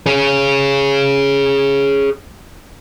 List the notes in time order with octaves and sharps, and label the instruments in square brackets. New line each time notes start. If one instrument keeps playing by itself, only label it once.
[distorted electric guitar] G#4 C#5